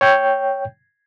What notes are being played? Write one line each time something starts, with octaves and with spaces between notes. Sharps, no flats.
C#5 G5 G6